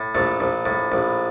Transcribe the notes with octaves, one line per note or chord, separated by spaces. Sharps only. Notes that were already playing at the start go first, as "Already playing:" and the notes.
Already playing: A2
A#1 A3
A#1
A2
A#1